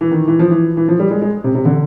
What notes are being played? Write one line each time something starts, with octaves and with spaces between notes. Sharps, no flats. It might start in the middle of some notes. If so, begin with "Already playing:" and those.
E3
D#3
E3
F3
E3
E3
F3
G3
G#3
G#3
C3
C3
D3